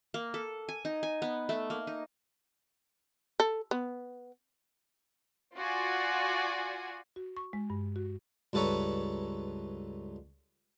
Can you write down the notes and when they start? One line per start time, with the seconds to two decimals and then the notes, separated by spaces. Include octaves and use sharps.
0.14 A#3
0.34 A4
0.69 G#5
0.85 D#4
1.03 G#5
1.22 B3
1.49 A3
1.70 A#3
1.87 D#4
3.40 A4
3.71 B3
5.56 F4 F#4 D5 G#5
7.16 F#4
7.37 C#6
7.53 G#3
7.70 G2
7.96 F#4
8.53 C#2 G2 A4 B4 C#5 A#5